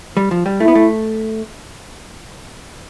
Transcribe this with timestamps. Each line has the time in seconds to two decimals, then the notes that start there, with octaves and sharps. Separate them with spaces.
0.17 G3
0.31 F3
0.46 G3
0.60 A3 E4
0.68 B3
0.75 A3